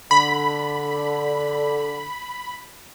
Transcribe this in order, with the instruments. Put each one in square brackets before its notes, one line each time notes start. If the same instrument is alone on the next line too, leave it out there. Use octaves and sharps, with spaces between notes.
[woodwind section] D3 [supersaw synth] B5